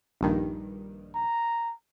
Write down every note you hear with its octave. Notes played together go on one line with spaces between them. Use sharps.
A#1 G2 D#3
A#5